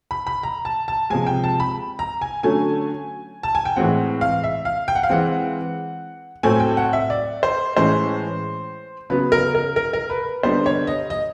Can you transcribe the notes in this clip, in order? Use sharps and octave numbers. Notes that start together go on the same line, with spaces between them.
B5
B5
A#5
A5
A5
C3 F3 G#3 G#5
G5
A5
B5
A#5
G#5
D3 F#3 A3 C#4 G#5
A5
G#5
G5
A2 E3 G#3 C4 F#5
F5
E5
F5
G5
F#5
F5
E3 G#3 C4 F#5
A2 F#3 A3 C4 G#5
G5
F#5
E5
D5
C5
A2 E3 G#3 C#4 C5
C#3 F#3 B3 B4
A#4
A#4
A#4
A#4
B4
D3 G3 B3 C5
C#5
D#5
D#5